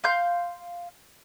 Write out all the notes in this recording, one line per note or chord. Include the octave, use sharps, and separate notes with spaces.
F5 C6 G6